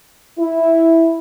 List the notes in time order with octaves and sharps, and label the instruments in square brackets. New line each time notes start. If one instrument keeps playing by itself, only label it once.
[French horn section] E4